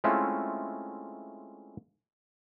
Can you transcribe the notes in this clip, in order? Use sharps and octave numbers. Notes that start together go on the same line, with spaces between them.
G#3 A3 C4 C#4 E4 F4